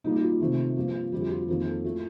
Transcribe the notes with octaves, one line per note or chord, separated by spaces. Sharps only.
A#2 G3 A#3 D#4
D#4
F4
C3 D#3 A3
G2 F3 A#3
F2 D3 G3 F4
G4
F4
G4
F2 D#3 A#3 A#4
A4
A2 A3 F4